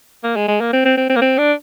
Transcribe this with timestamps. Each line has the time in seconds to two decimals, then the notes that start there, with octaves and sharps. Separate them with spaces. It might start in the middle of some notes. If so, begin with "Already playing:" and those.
0.24 A#3
0.36 G#3
0.48 G#3
0.61 A#3
0.73 C4
0.85 C4
0.97 C4
1.10 C4
1.16 A#3
1.22 C4
1.38 D4